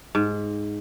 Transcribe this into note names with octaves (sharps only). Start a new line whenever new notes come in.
G#2